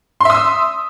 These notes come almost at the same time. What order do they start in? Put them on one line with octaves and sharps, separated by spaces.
C6 E5 D#6 E6